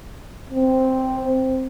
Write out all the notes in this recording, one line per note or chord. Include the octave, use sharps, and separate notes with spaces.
C4